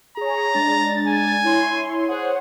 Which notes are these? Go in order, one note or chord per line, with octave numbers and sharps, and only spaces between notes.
G#4 C#5 A#5
G#3 D4 A6
G#5
E4 C#5 C6
G#4 C5 C#5 F#5